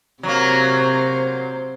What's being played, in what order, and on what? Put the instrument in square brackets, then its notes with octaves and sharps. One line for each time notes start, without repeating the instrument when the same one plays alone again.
[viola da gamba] C3 C5 [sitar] F#3 A#3